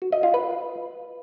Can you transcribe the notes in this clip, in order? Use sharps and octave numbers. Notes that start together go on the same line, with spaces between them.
F#4
D#5
F4
B4